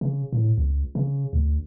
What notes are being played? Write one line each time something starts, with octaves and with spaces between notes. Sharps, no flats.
C#3
A2
C#2
C#3
D2